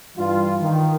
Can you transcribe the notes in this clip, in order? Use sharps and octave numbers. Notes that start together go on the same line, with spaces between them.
G2 E3 F4
D#3